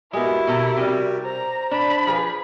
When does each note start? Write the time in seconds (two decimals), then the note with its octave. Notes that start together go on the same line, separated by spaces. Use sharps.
0.13 G#3 B3 E4 F#4 G4 A#4
0.47 B2 A4 A#5
0.77 C3 G3
1.25 C5 A#5
1.71 D4 B5
2.07 F3 G#4 B4